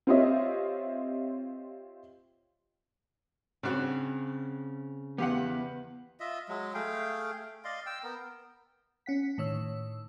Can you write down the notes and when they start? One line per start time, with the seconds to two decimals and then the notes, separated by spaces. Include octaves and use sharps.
0.07 C4 F4 G4 C#5 D#5 E5
3.63 G2 C#3 C4 F#4
5.18 E2 B3 G4 F5 F#5
6.20 F4 D#5 E5
6.49 F#3 G#3
6.74 A3 G#4 F5 G5
7.64 D5 D#5 F5 C6
7.86 G5 E6
8.03 B3 A#4
9.06 C#4 F#5 B6
9.38 A2 D#3 C#5 E6